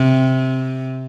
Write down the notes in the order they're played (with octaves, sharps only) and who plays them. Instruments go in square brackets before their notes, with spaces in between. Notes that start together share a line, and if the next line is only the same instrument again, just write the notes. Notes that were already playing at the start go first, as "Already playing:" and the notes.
Already playing: [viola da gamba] C3